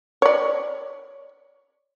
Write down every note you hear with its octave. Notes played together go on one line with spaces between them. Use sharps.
C#5 D5